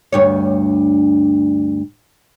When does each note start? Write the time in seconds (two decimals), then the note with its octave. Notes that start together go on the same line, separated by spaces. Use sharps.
0.12 D2 G2 C#5